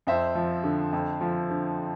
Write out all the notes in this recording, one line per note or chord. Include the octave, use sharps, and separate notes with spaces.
F2 C5 E5
F3
D3
F2
F3
D3